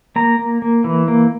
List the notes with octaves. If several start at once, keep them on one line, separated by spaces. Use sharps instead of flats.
A#3 A#5
A#3
A#3
E3
A#3